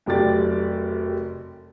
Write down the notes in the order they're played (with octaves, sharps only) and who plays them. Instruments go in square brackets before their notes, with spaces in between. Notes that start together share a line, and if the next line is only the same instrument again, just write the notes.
[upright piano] F1 F#2 G4 D5 A6